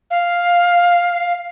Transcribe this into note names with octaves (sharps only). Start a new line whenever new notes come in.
F5